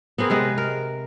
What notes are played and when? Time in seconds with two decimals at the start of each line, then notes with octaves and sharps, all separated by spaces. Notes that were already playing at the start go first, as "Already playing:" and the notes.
0.18 B3 C4 G#4 A#4
0.30 C3 G#3 B4
0.58 A#4